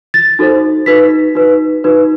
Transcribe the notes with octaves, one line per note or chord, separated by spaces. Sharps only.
A6
D#4 F#4 A4 C5
D#4 F#4 B4 B6
D#4 F#4 B4
D#4 F#4 B4